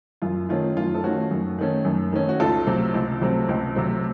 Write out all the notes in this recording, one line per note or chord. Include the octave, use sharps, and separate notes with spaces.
F#2 F4
D#3 A3 C#4 F4
F#2 F4
A4
D#3 A3 C#4 F#4
F#2
D#3 A3 C#4
F#2
D#3 A3 C#4
F#4
C#2 F4 A4
C3 F#3 A3 C4
C#2
C3 F#3 A3 C4
C#2
C3 F#3 A3 C4